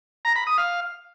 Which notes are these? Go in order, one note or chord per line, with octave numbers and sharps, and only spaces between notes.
A#5
B5
D#6
F5